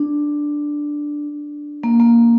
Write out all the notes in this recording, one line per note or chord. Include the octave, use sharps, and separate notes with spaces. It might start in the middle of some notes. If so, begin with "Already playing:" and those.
Already playing: D4
A#3
A#3